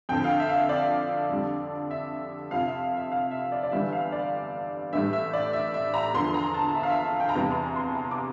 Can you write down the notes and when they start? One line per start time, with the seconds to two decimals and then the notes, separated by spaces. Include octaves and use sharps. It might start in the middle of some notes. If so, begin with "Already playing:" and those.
0.09 F2 D3 F3 G5
0.24 F5
0.39 E5
0.49 F5
0.55 E5
0.69 D5
1.30 F2 D3 G3
1.91 E5
2.51 F2 C3 F3 F5
2.66 E5
2.97 E5
3.12 F5
3.31 E5
3.52 D5
3.63 D5
3.72 G1 G2 E3 G3 E5
3.92 F5
4.12 D5
4.93 A1 A2 G3 E5
5.13 E5
5.33 D5
5.53 E5
5.74 E5
5.94 A#5
6.14 E2 D3 F3 C6
6.34 A#5
6.54 A5
6.74 E5
6.83 F5
6.90 E5
7.05 E5
7.20 G5
7.29 A#5
7.35 E2 C3 E3 G3 A5
7.51 C6
7.55 A#5
7.76 C6
7.95 A#5
8.11 D6